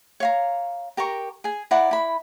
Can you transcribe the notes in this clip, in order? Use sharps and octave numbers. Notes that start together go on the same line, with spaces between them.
C#5 F5 A#5
G4 A#4 A#5 C#6
G#4 G#5
E4 D5 F#5 A#5
E4 B5